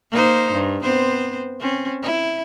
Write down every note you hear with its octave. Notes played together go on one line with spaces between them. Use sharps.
A#3 D#4 C5
G2
B3 C4 C5
C4 C#4
E4